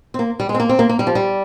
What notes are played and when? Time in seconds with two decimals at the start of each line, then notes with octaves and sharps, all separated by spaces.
0.14 C4
0.19 A#3
0.40 G3
0.49 G#3
0.55 C4
0.60 A#3
0.69 C4
0.79 A#3
0.89 A#3
0.99 G3
1.07 F3
1.15 G3